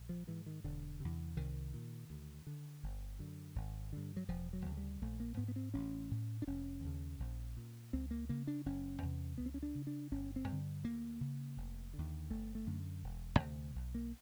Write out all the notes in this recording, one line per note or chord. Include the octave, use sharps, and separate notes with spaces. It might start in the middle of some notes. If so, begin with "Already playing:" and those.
Already playing: A#1
F3
G#2 E3
D#3
E1 D3
E2 C3
C2 D#3
A#2
D2
D3
G1
F#2 D3
G#1
G2 D3
F#3
E1 F3
F#3
D2 C#3
G3
A#1 A3
A#3
G#2 B3
B3
C4
A1 C#4
A2
D4
F1 C#4
D#2 C#3
A#1
A#2
C#2 C4
A#3
C#3 A#3
D4
F#1 C#4
E2 C3
C#2 B3
C4
C#4
D4
C#3
D4
G1 C#4
C4
G2 D3
D2 A#3
C#3
F1
D#2 D3
G1 A3
A3
F#2 D3
E1
D2 C3
B1
A#3